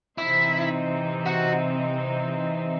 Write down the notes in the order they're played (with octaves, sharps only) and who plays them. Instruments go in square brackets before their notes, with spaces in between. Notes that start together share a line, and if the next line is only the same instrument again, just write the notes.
[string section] C3 E3 C4 D#4 [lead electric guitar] E4
[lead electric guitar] F#4